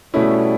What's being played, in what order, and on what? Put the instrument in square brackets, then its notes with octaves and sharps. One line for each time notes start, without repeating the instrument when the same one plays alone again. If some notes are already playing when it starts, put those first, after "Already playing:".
[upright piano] B2 A3 C#4 E4 [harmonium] G3